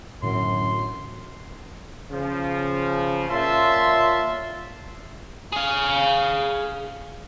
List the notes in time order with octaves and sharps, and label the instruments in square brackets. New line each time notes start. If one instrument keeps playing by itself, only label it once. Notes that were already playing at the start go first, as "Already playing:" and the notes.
[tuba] F#2 [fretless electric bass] A2 D3 E3 [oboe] C6
[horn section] C#3 F3
A#2 F4 C#5 E5 A5 C6
[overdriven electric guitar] G#4 F5